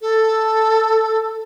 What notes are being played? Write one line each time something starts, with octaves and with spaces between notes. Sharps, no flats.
A4